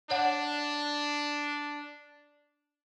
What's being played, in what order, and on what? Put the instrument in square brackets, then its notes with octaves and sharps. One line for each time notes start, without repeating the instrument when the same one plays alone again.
[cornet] D4 [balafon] C#5 F#5